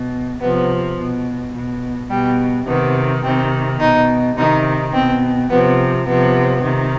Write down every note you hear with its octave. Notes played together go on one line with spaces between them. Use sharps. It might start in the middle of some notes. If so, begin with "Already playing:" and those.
Already playing: B2
C3 F3 B3
B2
B2
B2 G3
C3 D#3 B3
C3 D#3 C4
B2 D#4
C3 D#3 D#4
B2 C4
C3 F3 B3
C3 F3 B3
C3 D#3